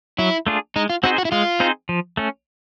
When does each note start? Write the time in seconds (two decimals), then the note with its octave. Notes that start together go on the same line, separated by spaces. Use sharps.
0.18 F#3 E4
0.47 A3 D4 F4 G#4
0.76 G#3 D#4
0.90 F4
1.03 C4 D#4 F#4 G#4 C5
1.18 F#4
1.25 E4
1.32 G#3 F4
1.60 C4 D#4 G#4 C5
1.89 F3
2.17 A3 C#4